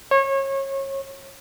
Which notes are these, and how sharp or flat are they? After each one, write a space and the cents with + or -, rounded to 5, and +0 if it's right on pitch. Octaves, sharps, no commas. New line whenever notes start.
C#5 -30